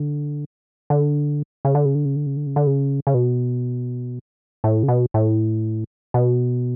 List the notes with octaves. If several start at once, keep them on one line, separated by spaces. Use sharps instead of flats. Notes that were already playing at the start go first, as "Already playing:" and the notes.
Already playing: D3
D3
C#3
D3
C#3
D3
C#3
D3
C#3
D3
C#3
D3
C#3
C#3
B2
A2
C#3
B2
A2
B2